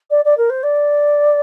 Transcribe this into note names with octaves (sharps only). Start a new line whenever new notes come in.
D5
D5
A#4
C5
D5